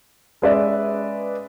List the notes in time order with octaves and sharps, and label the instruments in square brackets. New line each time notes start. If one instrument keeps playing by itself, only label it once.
[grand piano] G#3 C#4 B4 D5 E5